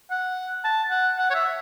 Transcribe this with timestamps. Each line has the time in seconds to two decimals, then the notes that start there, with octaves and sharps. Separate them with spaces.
0.11 F#5
0.64 A5
0.91 F#5
1.17 F#5
1.30 C#5
1.34 E5